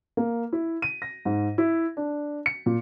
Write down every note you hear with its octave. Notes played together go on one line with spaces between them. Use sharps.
A#3
E4
D#7
A#6
G#2
E4
D4
C#7
A#2